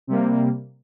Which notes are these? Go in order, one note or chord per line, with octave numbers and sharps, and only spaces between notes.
C3 G3 A#3